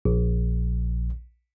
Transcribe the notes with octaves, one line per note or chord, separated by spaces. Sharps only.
A#1